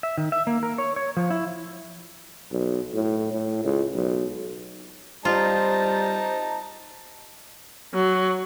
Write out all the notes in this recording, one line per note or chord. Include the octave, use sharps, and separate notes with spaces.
E5
D#3
E5
A#3
A#4
C#5
C#5
F3
E4
B1
A2
A2
C#2
B1
G3 D#4 F4 C5 A5 A#5
F#3